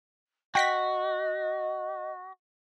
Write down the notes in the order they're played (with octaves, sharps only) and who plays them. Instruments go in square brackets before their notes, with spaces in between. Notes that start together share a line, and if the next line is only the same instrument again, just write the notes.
[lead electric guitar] F#4 [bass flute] D#5 [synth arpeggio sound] G5 A#6 B6